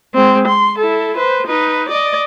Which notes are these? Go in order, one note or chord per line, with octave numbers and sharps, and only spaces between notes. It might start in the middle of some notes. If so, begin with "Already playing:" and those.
G#3 C4
C6
E4 A4
B4 C5
D#4 B4
D5 D#5